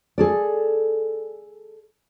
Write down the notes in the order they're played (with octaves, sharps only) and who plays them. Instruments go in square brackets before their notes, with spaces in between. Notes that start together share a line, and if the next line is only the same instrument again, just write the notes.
[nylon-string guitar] G#4 A4 D5